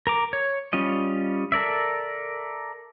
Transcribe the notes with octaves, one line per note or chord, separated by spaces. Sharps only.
A#4 A#5 D6
C#5
G3 C#4 F4 D#5
A4 A#4 D5 E5